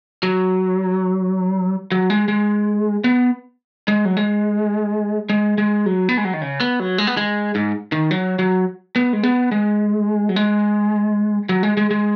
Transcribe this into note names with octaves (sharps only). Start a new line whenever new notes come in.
F#3
F#3
G#3
G#3
B3
G#3
F#3
G#3
G#3
G#3
F#3
B3
G#3
F#3
D#3
C#3
B3
F#3
G#3
B3
G#3
G#2
D#3
F#3
F#3
B3
G#3
B3
G#3
F#3
G#3
F#3
G#3
G#3
G#3